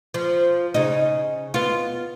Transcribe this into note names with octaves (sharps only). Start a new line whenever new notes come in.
F3
C#3 D#4
B3 F4